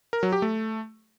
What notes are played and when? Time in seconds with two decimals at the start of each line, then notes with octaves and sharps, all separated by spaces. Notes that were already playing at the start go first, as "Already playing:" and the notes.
0.13 A#4
0.23 F#3
0.32 G4
0.42 A3